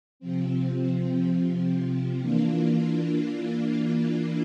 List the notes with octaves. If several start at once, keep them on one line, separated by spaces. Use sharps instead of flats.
C3 F3 C4
E3 A#3 D4 F4